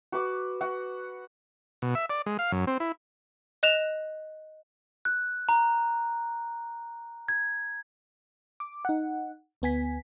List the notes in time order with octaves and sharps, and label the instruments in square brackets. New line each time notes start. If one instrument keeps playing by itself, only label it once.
[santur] F#4 B4 D6
F#4 F#5
[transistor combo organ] B2
E5
D5
G#3
F5
F#2
C4
E4
[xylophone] D#5 F#6 E7 F7
[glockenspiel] F#6
A#5
G#6
[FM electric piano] D6
D#4 F#5
D2 B3 G#5 B6